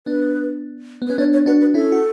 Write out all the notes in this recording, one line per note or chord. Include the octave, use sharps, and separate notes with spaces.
B3 D4 B4
B3
C#4 B4
B3 D4 C#5
C#5
D4 F#4 B4
B4
C#4 E4 A4
F#4